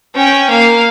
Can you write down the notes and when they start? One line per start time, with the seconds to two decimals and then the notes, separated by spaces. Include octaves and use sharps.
0.15 C#4 G5
0.50 A#3 F5